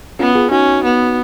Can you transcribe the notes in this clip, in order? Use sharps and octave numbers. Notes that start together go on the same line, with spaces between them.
B3 C#4 F4
F4 G#4
C#4 D#4 F#4
B3